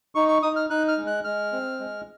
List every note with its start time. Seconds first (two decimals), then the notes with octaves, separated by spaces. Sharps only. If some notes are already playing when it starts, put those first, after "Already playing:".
0.15 D#4 C#6
0.28 C#6
0.43 D#4 D#6
0.56 F6
0.70 D#4 F#6
0.88 F6
0.98 G#3
1.07 F#6
1.24 G#3 F6
1.52 C4
1.80 G#3